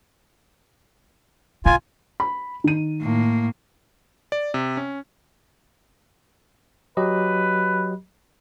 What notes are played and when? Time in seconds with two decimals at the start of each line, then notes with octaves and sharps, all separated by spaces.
1.66 B2 F4 G#5
2.20 B5
2.64 D#3 D#7
3.01 A2 A#3
4.32 D5
4.54 C3
4.77 C#4
6.97 F#3 G4 B4 D#5